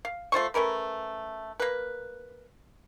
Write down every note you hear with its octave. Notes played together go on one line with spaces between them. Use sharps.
F5
A3 F4 C5 C#6
A3 C#4 A#4 B4
A#3 B4